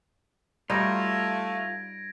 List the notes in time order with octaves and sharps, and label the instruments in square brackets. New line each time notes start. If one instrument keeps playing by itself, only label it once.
[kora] G3 D#4 F#4 [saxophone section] A3 [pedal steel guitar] F4 [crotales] G#6 A#6 D7